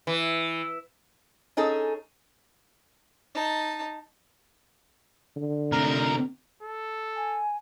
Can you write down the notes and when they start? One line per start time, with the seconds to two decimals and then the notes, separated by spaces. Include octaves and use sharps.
0.07 E3
1.57 C#4 D#4 G#4 A4
3.34 D#4 A5
5.37 D3
5.72 C3 A3 A#4
6.63 A4
7.17 G#5